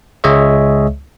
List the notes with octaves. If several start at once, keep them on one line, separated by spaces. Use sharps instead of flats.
C#2 G#3 G#4 C#5 D#5 E5